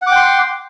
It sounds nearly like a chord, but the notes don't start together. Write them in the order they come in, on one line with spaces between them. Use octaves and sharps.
F#5 D6 G5 C6